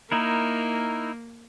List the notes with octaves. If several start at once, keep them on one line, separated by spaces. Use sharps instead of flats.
A#3 D#4 E4 A#4